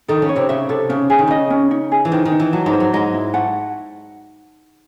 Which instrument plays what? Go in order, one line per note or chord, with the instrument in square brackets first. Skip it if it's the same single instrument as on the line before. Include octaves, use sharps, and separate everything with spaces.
[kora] D#3 D#4 [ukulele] A4
[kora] C#3 C#4
[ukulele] C#5
[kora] C3 C4
[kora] C#3 [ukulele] E5
[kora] C3 [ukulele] A4
[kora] C#3 [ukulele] C#4
[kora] C#3 [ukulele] G#4
[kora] D#3
[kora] C#3 [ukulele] D#5
[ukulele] C#4
D#4
G#4
[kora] E3
[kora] D#3 [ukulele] C5
[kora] D#3
[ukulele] D#4
[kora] E3
[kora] F#3 [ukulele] A5
[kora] G#2 G#3
[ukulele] C5
[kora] F#3
[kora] G#2 G#3 [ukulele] D#5
[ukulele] E4
[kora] A3 [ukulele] F#5